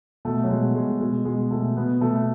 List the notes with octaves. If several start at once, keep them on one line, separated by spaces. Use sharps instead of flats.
B2 A3
F#3
B2 G#3
B2 G#3
B2 G#3
B2 G#3
B2 A3
B2 B3
B2 A3